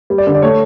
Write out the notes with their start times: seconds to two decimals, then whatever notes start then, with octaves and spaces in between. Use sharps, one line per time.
0.10 G3
0.18 D5
0.27 D3
0.35 D5
0.42 A3 C#5